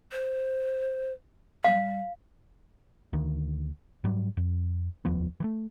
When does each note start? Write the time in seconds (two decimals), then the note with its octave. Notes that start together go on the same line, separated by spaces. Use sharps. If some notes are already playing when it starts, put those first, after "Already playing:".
0.12 C5
1.64 G3 F5
3.13 D2 D#3
4.04 G#2 F#3 G3
4.37 F2
5.05 F1 D#2 F3 B3
5.40 E3 A3